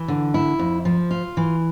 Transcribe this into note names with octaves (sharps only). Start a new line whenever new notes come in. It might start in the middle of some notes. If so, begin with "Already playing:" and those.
Already playing: E3
D3
E4
F2
F3
F4
E3